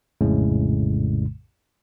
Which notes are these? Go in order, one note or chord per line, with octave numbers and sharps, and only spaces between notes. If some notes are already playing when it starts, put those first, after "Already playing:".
A#1 F2 A2 C#3 G#3